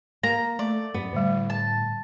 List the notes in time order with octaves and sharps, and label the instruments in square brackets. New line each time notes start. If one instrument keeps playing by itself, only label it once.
[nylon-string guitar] A#3 [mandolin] A#5
[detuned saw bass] A3 [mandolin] D5
[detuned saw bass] F#2 [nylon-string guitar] B3
[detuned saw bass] A2 [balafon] D3 G3
[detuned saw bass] A2 [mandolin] A5